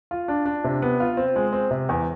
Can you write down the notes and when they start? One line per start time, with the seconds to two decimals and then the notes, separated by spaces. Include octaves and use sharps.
0.11 F4
0.28 D4
0.45 D4
0.64 C3
0.82 B3
1.00 F4
1.17 C4
1.36 G#3
1.53 C4
1.71 C3
1.89 E2